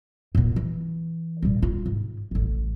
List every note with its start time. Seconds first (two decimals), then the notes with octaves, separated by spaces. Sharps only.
0.35 A#2 B3
0.56 E3
1.42 A#2 G3
1.63 F4
1.86 G#2
2.31 A1 D2